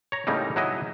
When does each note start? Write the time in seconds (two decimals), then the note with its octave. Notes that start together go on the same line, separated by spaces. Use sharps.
0.12 C#5 A#5
0.27 A2 C#3 G3 A#3 C4 D#4
0.56 F#3 D#4 E4 F#4 G#4 D#5